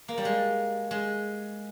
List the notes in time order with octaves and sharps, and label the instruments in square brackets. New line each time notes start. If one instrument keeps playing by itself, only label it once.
[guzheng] A#3
G3
G#3
G#3